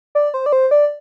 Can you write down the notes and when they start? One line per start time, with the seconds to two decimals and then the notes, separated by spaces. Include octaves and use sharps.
0.15 D5
0.34 C5
0.46 D5
0.53 C5
0.71 D5